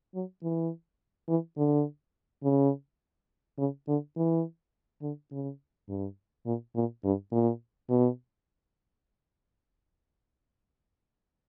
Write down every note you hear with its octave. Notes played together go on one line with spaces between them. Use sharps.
F#3
E3
E3
D3
C#3
C#3
D3
E3
D3
C#3
G2
A#2
A#2
G2
A#2
B2